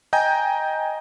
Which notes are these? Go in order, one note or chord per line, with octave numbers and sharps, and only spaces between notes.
D#5 G5 G#5 A#5 G6